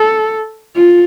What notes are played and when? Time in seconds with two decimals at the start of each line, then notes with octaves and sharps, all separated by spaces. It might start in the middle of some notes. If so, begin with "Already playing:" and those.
Already playing: A4
0.76 F4